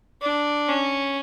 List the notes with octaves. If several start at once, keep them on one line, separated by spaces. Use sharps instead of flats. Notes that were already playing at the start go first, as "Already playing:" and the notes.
D4
C#4